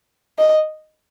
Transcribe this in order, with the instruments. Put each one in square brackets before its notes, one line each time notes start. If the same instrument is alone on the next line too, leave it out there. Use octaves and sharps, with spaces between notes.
[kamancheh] D#5